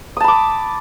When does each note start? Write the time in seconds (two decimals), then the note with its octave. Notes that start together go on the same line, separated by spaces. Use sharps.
0.17 D#6
0.20 A5
0.24 B5
0.28 D6